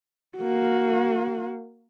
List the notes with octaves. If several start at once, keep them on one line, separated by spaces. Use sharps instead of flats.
A#3 F#4